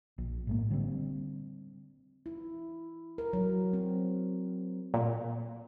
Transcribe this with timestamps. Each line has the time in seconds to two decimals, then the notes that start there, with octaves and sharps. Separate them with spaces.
0.18 A#1
0.47 A2 G#3 A#3
0.70 D3 G3 A3 C4
2.26 E4
3.18 A#4
3.33 F#3
3.73 C4
4.94 A#2